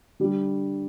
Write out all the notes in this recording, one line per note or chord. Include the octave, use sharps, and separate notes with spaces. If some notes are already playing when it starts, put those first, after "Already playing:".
D3 G3